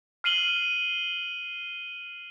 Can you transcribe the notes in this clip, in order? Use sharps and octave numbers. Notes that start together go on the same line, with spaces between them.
F6 C7 D#7 F#7 G7